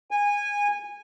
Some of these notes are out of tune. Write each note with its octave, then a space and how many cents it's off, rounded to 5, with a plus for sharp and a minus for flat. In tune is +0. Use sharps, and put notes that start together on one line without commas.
G#5 -20